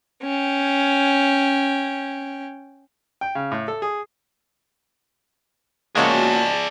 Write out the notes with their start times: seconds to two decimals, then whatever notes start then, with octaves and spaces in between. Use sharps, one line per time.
0.23 C#4 G5
3.21 G5
3.35 C#3
3.52 A2
3.68 A4
3.82 G#4
5.95 C#2 G#3 A#3 F#4 G#4 C#5 D5 A5